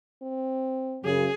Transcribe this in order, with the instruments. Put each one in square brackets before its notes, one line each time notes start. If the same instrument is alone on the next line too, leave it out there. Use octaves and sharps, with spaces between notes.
[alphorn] C4
[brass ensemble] F#2 C#3 [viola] G#4